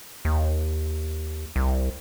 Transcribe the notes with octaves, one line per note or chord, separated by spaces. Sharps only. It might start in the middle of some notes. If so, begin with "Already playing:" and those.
D#2
C2